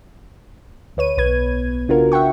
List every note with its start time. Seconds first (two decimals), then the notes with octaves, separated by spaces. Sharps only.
0.97 D2 B4 C#5 D#7
1.17 B1 B3 B4 G#6
1.88 C#3 D4 F4 F#4 A#4
2.12 E5 F#5 G5 C#6